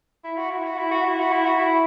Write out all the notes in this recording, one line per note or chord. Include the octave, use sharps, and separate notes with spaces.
E4
F#4
E4
F#4
E4
F#4
E4
F#4
E4
F#4
E4